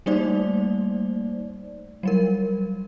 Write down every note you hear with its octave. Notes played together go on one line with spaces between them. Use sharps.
G3 A3 A#3 D#4 C5 D5
F#3 G3 A#4